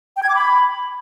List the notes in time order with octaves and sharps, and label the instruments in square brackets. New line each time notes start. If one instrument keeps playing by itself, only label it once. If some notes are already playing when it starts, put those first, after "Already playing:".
[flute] G5
G#6
D6
B5